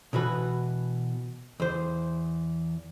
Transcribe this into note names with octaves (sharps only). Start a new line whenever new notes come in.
B2 E3 F#4 B4
E2 C5